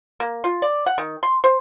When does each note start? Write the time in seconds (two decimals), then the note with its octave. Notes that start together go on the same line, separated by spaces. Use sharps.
0.20 A#3
0.44 F4
0.62 D5
0.86 F#5
0.98 D#3
1.23 C6
1.44 C5